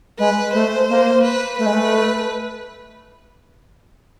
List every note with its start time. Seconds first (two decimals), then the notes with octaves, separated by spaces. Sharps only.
0.18 G#3 B4
0.53 A3 C5
0.89 A#3
1.23 B4
1.58 A3 B4
1.66 G#3
1.73 A3